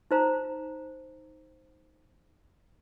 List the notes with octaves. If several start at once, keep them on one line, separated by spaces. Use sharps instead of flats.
D#4 C5 A#5